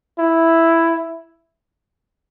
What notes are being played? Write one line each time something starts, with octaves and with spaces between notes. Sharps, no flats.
E4